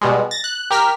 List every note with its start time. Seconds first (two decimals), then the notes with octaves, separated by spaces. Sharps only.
0.01 B2 G3 G#3
0.31 A6 A#6
0.44 F#6
0.71 G4 A#4 F6 B6